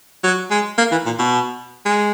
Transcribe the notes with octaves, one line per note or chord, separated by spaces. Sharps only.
F#3
G#3
A#3
E3
A#2
B2
G#3